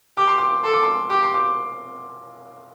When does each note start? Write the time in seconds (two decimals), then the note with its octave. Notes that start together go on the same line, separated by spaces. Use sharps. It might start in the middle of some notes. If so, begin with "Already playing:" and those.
0.17 G4 D6
0.27 C6
0.38 D6
0.63 A4 C6
0.73 D6
0.83 C6
1.10 G4 D6
1.23 C6
1.34 D6